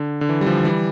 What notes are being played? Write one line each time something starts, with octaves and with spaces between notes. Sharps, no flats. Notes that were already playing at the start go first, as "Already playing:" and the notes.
Already playing: D3
D3
E3
G3
D3 F3
E3 G3